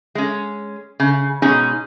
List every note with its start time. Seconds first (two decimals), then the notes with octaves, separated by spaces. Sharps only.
0.15 G#3 C#4
1.00 C#3
1.42 G#2 B2 C#4 D#4 G#4